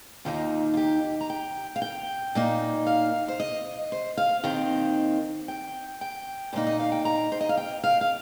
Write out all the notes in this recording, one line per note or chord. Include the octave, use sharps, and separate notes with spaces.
D#2 D#3 A#3 D#4 F4
F4
G4
A#5
G5
F5
G5
A#2 A#3 D#4
F5
C5
D#5
C5
F5
D#2 D#3 C4 G5
G5
G5
A#2 A#3 D#4 C5
D#5
F5
G5
A#5
C5
D#5
F5
G5
F5
F5